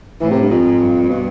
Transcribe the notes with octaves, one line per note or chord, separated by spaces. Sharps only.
A2 E3
C3
G2
F2 G#2
G2
B2